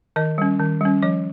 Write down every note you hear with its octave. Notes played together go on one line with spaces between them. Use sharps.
D#3 D#5
G3 C#4
D#3
G3 C#4
F3 D#5